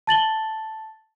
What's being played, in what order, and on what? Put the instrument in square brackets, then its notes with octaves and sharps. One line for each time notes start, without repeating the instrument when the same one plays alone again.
[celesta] A5 A6 F#7 G7